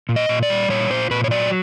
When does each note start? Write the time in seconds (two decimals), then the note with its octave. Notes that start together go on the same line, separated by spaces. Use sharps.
0.09 A#2
0.16 D#5
0.29 A#2
0.43 D5
0.50 G3
0.69 A#2 C#5
0.90 A#2 C5
1.11 A#2 B4
1.24 C#5
1.31 F#3 D5